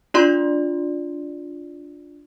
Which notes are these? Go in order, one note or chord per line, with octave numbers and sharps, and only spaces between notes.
D4 F4 D5 C6